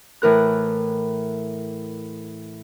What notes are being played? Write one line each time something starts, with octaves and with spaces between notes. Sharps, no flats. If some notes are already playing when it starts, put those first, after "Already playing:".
A2 E3 A#4 F#6